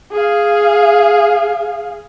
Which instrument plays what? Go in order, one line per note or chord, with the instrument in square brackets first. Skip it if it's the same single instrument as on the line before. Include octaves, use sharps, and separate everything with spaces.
[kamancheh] G#4 F5